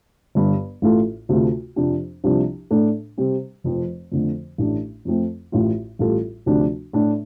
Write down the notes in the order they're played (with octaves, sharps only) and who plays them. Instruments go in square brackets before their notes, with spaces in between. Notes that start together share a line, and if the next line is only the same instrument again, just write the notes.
[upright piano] G1 G2 G3
A1 A2 A3 F4 A4
D2 C3 A3 F4
F2 C3 F3 D4 G4
C2 C3 F3 D4
A2 A3 D4 A4
C3 G3 C4 G4
F1 F2 F3 C4
F2 D3 A3
A1 A2 A3 D4
F2 F3 A3 C4
A1 A2 A3 F4
A1 A2 G3 F4 A4
D2 C3 F3 A3 D4
A2 A3 D4